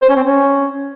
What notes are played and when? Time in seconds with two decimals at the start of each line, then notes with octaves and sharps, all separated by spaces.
0.02 C5
0.09 C#4
0.16 C4
0.23 C#4